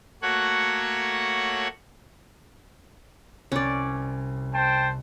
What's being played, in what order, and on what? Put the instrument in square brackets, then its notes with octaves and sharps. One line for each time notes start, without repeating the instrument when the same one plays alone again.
[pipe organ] A3 A#3 F#4 C#5 F#5
[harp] C2 [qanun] C#4 D5
[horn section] C5 G5 A5